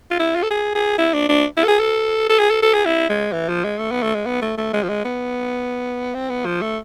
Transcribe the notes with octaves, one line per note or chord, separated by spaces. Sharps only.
F4
E4
F4
A4
G#4
G#4
E4
D4
D4
E4
A4
G#4
A4
A4
G#4
A4
A4
G#4
E4
G#3
E3
F3
G#3
A3
B3
A3
G#3
B3
A3
A3
G#3
F3
G#3
B3
C4
B3
F3
A3